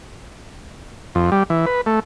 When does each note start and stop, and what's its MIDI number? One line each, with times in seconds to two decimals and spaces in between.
1.15 1.30 41
1.32 1.43 55
1.50 1.66 52
1.66 1.81 71
1.86 2.00 57